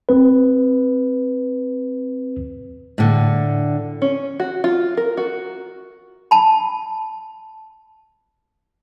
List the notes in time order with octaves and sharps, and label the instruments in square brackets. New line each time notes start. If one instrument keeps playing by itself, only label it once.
[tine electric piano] C4 B4
[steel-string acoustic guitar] A2 D3
[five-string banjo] C#4
F#4
F4
A#4
F#4
[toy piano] A5 B5